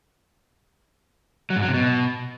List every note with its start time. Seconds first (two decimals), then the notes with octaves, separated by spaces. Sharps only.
1.50 F#3
1.56 G#2
1.62 F#3
1.68 C3
1.74 B2